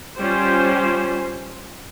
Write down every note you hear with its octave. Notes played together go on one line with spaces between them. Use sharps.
G3 C#4 F4 C5